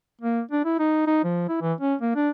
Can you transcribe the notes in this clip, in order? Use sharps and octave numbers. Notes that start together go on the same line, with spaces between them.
A#3
D4
E4
D#4
D#4
F3
E4
E3
C#4
A#3
D4